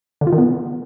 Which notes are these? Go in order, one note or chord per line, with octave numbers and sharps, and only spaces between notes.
D3
F4
D#3
B3